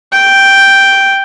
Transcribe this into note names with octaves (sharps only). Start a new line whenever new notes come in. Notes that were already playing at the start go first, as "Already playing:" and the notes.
G5